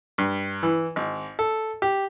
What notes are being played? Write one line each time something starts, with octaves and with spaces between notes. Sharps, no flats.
G2
E3
G#1
A4
G4